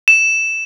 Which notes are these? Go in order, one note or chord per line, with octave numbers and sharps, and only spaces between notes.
E7